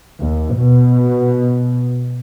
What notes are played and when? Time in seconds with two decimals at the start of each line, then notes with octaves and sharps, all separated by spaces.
0.21 D#2
0.57 B2